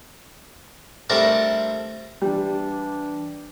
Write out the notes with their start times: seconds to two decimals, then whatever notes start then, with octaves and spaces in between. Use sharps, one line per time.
1.10 G3 A3 C4 D4 A#4 F#5
2.22 E3 G3 D4